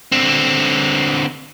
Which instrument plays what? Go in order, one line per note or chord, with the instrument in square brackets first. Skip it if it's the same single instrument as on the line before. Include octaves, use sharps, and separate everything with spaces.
[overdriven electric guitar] D3 C4